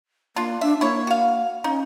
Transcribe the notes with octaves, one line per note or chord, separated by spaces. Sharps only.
A#3 D4 F4
D4 E5
A#3 E4 C#5
F#4 F5
C#4 D#4